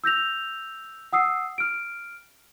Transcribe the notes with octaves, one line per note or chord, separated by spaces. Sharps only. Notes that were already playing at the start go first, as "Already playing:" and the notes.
E6 G6 A#6 F7
F#5 D#6 E6 C7
F6 D7